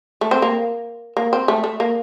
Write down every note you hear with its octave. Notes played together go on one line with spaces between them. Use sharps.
A3
C4
A#3
A#3
C4
A3
A3
A#3